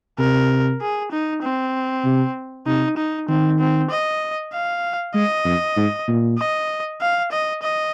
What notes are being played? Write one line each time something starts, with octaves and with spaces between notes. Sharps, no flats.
C3 A#4
G#4
D#4
C4
C3
C3 D#4
D#4
D#3 C4
C4
D#5
F5
G#3 D#5
F2
G#2
A#2
D#5
F5
D#5
D#5